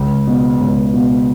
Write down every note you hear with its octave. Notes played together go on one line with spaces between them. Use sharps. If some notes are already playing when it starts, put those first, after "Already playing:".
Already playing: C#2
B2
C#2
B2